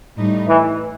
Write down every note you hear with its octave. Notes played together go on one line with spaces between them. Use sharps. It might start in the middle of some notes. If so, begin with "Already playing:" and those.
A2 G3 D#4
E3